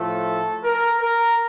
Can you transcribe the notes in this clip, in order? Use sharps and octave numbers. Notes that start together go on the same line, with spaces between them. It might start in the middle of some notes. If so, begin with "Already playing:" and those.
Already playing: A2 F3 A3 A4
A#4
A#4